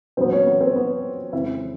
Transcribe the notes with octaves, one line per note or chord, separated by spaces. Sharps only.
A#2 F#3 B3 C4 C5
C#4 C#5
B3 B4
C4 C5
B3 B4
F2 C#3 F3 G#3 C4 E4 E5